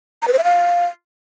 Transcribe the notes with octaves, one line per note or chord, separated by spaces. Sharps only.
A#5
B4
C5
E5
F5